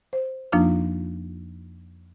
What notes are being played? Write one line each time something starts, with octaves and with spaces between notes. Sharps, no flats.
C5
F2 F3 A#3 D4 D#4 F4